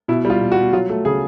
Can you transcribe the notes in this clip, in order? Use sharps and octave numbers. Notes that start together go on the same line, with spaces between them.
B2 E4
G3
F4
B2
F#4
B2
F#3 F4
A3
C#3 G#4